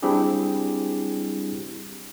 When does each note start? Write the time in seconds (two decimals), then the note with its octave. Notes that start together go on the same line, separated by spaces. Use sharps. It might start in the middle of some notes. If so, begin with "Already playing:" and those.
0.03 G3 C4 D4 E4 G4 G#4